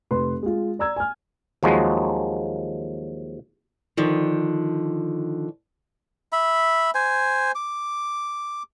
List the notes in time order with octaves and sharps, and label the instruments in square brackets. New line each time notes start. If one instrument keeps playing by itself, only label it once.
[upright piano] F1 B4 C6
G#3 F4
D5 A#5 E6 G#6
G#5 F6
[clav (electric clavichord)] D#2 F3 F#3 G#3 F#4
[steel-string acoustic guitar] D3 D#3 F3
[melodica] E5 B5
C5 G#5
D6